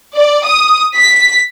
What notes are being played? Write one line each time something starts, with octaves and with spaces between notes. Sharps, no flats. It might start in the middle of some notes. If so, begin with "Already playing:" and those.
D5
D#6
B6